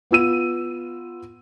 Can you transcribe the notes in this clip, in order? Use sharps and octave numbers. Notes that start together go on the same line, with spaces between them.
B3 F4 E6 D#7